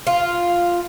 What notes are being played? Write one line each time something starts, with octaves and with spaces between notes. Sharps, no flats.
F4